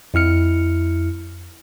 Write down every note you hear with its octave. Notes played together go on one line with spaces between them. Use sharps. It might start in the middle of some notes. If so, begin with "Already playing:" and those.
F2 E4 F6 C#7